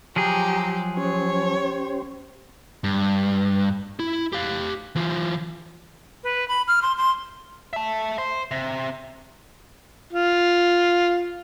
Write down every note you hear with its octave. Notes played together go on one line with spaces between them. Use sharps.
F3 F#3 G4 G#4 A#5
C#4 G4 C5 C#5
G2
E4
G4 F5
E3 F4
B4
B5
F6
C6
C6
E5 A5
C5
C3
F4